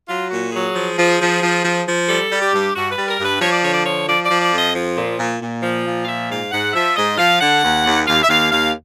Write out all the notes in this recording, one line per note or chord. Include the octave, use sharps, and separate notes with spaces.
F#3 F4
A#2 F#4
F#3 G#4
F3
F3
F3
F3
F3
F3
G3 A4
G3
G4
G2
G2 F#4
B4
G3
A#4
G2
B4
F3 C#5
D5
D3 C#5
D5
F3 C#5
F3 D5
D5
F3
D5
F2 D#5
F3
A#2
A#2
A#2
F3
A#2
F5
F3 E5
G#2 F5
G#2 F#5
F3 E5
G#2 D#5
F3 F5
D3 F#5
D#2
D#2
D#2 F5
E5
D#2 F5
D#2 F5